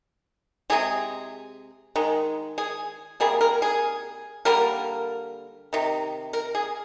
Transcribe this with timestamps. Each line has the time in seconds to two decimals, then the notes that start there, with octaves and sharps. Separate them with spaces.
0.70 C3 D#3 G#3 G#4
1.96 D#3 G#3
2.58 G#4
3.20 C3 G3 A#3 G#4
3.41 A#4
3.62 G#4
4.45 D3 G3 A#3 A#4
5.73 C3 D#3
6.33 A#4
6.55 G#4